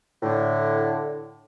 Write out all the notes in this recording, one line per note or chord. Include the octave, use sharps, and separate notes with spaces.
A2 D3